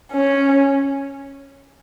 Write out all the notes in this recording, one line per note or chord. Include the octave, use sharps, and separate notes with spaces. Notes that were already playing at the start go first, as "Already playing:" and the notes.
C#4